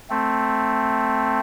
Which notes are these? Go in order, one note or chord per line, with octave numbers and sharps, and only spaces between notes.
A3 C4